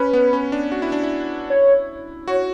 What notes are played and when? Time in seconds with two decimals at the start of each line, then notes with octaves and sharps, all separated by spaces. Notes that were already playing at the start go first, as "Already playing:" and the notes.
Already playing: C#4 B4
0.13 B3
0.33 C#4
0.52 D4
0.72 F#4
0.82 E4
0.92 D4
1.03 E4
1.50 C#5
2.28 F#4 C#5